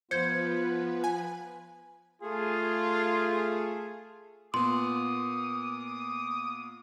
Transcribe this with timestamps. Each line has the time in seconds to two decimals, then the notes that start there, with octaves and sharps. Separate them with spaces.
0.11 F3 B3 F4 B4 C5 G6 G#6 C#7
1.04 G#5
2.22 A3 F4 G#4
4.54 A#2 A#3 B3 C6 D6 D#6